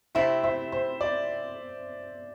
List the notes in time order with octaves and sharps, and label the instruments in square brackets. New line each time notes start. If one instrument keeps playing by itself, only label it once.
[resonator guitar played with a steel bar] C3 A3 C4 E4 [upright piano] C5 E5
[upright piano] C5 E5
C5
D5